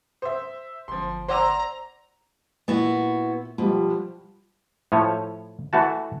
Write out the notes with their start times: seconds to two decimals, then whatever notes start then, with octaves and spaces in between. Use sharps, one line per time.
0.22 C5 E5 D#6
0.88 G1 F3 C6
1.29 C5 D5 F#5 A#5 C6 D6 E6
2.68 A#2 B3 E4 F#4
3.58 B2 F3 G3
4.92 A2 F3 C#5
5.73 E3 A3 F#4 A5